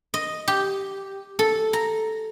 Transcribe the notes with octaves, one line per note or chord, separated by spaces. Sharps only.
D#5
G4
A4
A#5